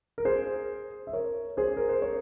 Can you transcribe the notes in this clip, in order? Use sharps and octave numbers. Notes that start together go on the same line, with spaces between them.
A#4
G#4 C5
E5
A#4 C#5
G#4 C5
A#4
C5
A#4 C#5